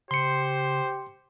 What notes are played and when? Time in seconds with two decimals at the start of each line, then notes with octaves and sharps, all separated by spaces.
0.11 C#3 G4 C5 C6 C#7